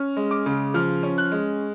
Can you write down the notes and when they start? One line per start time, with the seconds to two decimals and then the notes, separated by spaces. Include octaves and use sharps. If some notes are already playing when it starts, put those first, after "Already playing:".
Already playing: C#4 F6
0.17 G#3
0.31 D6
0.46 C#3
0.74 F3 F6
1.03 C#4
1.18 F#6
1.32 G#3